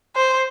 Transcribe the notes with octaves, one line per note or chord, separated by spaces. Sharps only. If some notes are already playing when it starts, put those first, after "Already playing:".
C5